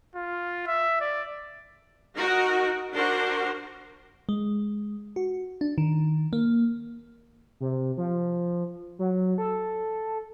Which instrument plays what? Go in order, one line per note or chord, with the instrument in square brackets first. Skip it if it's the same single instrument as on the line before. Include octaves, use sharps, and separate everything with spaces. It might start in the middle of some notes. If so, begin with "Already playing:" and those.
[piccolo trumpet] F4
E5
D5
[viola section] D#4 F#4 A#4
D4 F#4 A#4 C5
[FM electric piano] G#3
F#4
D4
D#3
A#3
[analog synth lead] C3
F3
F#3
A4